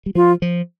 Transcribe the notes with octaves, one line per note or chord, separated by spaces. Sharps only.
G3
F3 F4
F3